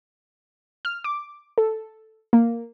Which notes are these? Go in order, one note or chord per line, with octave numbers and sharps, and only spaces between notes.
F6
D6
A4
A#3